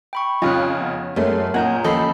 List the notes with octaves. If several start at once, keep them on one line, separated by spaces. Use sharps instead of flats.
G5 B5 C#6
F2 C#3 F4 D#5 F6 F#6
B3
F#2 G#3 A3 C#4 A#4
A#2 A#4 C#5 D#5 F#5 G6
D#2 F3 C#4 A4 D#5 B5 C7